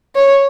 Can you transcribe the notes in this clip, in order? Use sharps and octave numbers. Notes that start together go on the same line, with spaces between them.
C#5